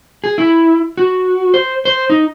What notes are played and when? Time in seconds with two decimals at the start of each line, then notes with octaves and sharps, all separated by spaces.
0.24 G#4
0.38 E4
0.98 F#4
1.54 C5
1.85 C5
2.10 D#4